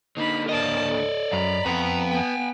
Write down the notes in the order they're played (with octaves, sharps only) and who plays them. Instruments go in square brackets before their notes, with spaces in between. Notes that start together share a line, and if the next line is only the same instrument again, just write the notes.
[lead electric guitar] D3 A#3 [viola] D#4 B5
[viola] A#4 A5 [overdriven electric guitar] D5 D#5
[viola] A4
[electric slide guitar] F#2 [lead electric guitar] A#5 [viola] B5
[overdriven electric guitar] F2 [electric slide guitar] B4 F#5 [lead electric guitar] A#5
[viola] B3 [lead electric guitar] G5 G#5